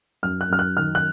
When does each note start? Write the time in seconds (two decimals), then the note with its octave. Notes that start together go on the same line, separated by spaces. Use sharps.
0.23 F#2 F6
0.41 F#6
0.50 F#2 F6
0.59 F#6
0.77 D#3 F6
0.95 F#6